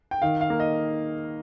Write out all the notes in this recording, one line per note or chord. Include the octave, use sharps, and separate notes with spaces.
G5
D#3 F5
F5
A#3
D#5